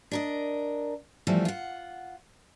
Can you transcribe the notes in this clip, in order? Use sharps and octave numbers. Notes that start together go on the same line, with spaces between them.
D4 A#4 D#5
E3 F3 G3 A3 B3
F4 F#5